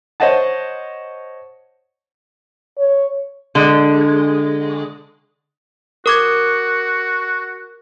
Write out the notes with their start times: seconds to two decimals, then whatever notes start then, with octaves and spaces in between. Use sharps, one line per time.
0.20 C5 C#5 D#5 F#5 A5
2.78 C#5
3.55 D3 G#3
6.06 F#4 A#4 D6 G#6